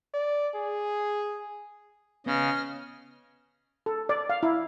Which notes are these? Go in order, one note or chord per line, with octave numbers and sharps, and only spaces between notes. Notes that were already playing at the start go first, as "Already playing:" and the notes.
D5
G#4
C#3 B3 D#5 F6
A4
D5
F5
E4